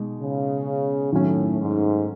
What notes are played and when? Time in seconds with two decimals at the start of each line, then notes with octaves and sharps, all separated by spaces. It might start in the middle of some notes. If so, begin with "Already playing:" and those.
Already playing: B2 G#3 D#4
0.20 C#3
1.12 A2 D#3 F#3 A3 C#4
1.59 G#2